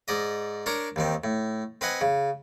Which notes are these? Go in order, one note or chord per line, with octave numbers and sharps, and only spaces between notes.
G#2 D5 D#5
D4 A#4 C#5 A#5
D#2 D#3 C4
A2
C4 B4 D#5 F#5 G#5
C#3